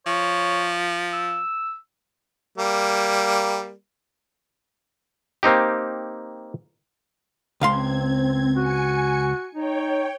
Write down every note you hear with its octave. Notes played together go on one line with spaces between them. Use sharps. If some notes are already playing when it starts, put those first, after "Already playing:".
F3 C#5
E6
G3 A#3
A#3 C4 D#4 G4
C#2 C4 F5 C6 G#6
F#4 G#5 C#7
D#4 C#5 G5